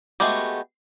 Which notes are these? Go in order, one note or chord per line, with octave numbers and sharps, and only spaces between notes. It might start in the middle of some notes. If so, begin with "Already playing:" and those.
G#3 A3 B3 F#4 G4